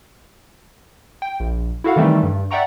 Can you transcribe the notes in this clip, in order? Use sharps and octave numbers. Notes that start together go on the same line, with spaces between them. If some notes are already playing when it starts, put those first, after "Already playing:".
G5
A#1
E4 F#4 A4 F5 F#5
D#3 E3 G3 A3 C4 D#4
G2
D5 E5 F#5 G5 A#5 C#6